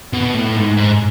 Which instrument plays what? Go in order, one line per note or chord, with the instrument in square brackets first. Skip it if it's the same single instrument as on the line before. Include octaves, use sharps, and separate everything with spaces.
[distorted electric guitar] B2
A2
G#2
G#2